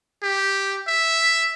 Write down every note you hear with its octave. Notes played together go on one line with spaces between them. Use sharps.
G4
E5